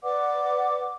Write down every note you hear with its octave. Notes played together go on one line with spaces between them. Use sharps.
B4 D5 F#5 D6